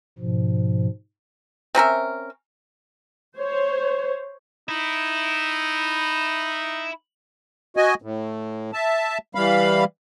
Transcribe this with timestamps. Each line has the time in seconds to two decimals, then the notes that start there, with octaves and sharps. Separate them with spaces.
0.18 G#2 B2 F3
1.75 C4 C#4 A#4 E5
3.37 C5 C#5
4.69 D#4 E4
7.77 F#4 D#5 G#5
8.02 A2
8.73 E5 A5
9.35 E3 G3 F5 B5